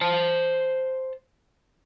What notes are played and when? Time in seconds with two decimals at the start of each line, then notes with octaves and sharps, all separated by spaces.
0.01 C5 A5